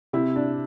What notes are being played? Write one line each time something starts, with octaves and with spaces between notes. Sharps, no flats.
C3 E4
D4